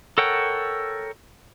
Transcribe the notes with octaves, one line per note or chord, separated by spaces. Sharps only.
A4 A#4 C#5 F#5 G5